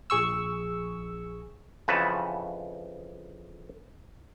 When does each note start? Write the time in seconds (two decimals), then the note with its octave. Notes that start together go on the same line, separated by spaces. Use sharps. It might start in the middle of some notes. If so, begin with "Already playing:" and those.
0.10 A#1 G#4 C#6 E6
1.88 F2 C#3 E3 F#4 B4 A5